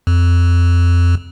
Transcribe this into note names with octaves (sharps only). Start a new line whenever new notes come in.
F2